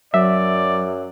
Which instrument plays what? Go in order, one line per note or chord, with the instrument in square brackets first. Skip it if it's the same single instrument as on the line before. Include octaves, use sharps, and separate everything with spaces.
[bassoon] F#2 [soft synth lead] F#3 [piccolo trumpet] D5 [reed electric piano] E5